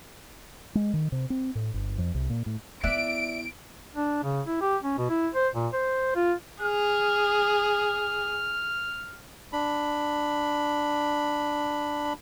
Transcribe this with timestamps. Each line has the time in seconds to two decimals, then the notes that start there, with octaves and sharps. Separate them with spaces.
0.75 G#3
0.93 D#3
1.12 C3
1.30 C4
1.55 A2
1.74 G1
1.98 F2
2.15 C2
2.30 A#2
2.46 A2
2.83 B3 E4 D5 E5 F#6 D7
3.95 D4
4.23 C#3
4.47 E4
4.61 G4
4.84 C#4
4.98 B2
5.10 E4
5.34 C5
5.54 A#2
5.73 C5
6.16 F4
6.62 G#4 F6
9.53 D4 B5